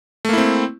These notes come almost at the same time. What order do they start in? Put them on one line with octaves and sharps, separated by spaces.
A3 A#3 E4 C4